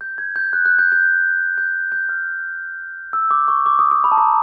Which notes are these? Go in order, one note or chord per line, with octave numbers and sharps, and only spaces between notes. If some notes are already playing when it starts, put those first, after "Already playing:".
G6
G#6
G6
F#6
F#6
G6
G6
G6
G6
F6
E6
D6
C#6
D6
D#6
D#6
B5
A5
A#5